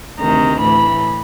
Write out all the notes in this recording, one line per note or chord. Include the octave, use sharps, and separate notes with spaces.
D2 C3 D#3 A#5
A2 E3 B5